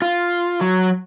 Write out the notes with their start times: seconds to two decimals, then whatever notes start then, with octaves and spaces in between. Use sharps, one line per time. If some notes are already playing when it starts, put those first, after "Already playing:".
0.02 F4
0.61 F#3